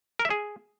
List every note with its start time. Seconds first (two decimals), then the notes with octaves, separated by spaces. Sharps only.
0.19 A#4
0.25 E5
0.30 G#4